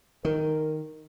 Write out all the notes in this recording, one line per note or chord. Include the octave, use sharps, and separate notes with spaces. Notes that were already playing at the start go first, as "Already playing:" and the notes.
D#3 A#4